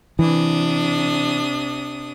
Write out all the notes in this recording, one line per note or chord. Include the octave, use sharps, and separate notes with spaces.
C3 E3 D4 D#6